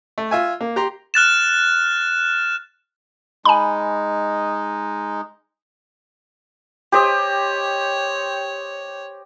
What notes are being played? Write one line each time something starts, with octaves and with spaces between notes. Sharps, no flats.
A3
F4 E5 G#5
A#3
G4 A#5 C6
F6 F#6 A6 E7
G#3 D#4 G#5 B5
G4 C5 C#5 D#5